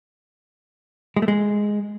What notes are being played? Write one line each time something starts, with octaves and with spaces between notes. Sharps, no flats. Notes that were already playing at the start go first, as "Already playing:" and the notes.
G#3
A3
G#3